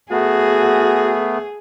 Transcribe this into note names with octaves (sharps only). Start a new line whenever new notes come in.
A3 B3 F#4 G#4